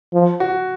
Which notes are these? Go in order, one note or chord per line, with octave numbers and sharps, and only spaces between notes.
F3
F#4